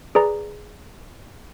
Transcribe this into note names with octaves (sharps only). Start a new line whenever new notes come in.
G#4 B4 D5 A#5